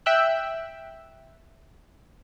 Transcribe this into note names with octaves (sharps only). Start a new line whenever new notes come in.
E5 G5 E6 F#6